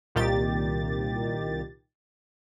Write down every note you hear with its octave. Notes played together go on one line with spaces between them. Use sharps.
C2 A#2 D#3 G4 A6